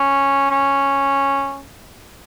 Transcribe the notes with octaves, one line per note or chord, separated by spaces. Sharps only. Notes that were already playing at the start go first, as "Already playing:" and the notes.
Already playing: C#4
C#4